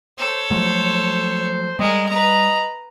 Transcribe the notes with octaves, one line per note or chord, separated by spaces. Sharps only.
A4 C5 C#5
F3 F#3 A3 C5
G3 G#3 A#4 D#5
B4 D#5 A#5